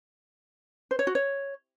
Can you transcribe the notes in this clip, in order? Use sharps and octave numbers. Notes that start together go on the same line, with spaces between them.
C5
C#5
F#4
C#5